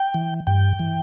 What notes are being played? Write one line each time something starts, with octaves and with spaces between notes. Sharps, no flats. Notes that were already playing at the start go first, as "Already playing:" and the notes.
Already playing: G5
E3
G2 G5
E3